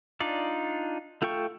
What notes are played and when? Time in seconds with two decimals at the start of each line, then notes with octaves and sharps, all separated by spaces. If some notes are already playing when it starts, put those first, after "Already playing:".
0.20 D4 D#4 F4 D5
1.22 A3 F4 A4 G5 C#6